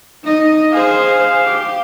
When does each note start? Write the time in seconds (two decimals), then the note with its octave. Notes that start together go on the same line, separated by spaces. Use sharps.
0.24 D#4 D#5
0.73 G#4 C5 F5
1.44 G4